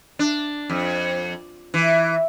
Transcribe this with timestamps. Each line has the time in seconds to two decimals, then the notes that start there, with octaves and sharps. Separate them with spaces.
0.19 D4
0.70 F2
1.74 E3